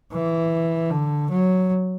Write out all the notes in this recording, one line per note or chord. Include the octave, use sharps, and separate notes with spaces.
E3
D3
F#3